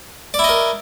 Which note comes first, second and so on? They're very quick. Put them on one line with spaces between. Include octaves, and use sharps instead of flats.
D5 E4 D#5 A#4